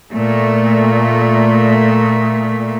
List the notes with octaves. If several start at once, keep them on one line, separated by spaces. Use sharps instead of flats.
A#2 A3